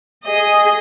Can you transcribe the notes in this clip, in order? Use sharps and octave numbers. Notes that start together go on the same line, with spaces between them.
G#4 D#5